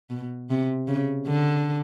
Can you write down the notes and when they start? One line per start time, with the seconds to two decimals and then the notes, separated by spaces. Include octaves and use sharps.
0.10 B2
0.50 C3
0.88 C#3
1.27 D3